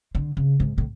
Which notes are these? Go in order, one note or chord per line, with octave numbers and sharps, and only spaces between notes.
D3
C#3
G#2
A2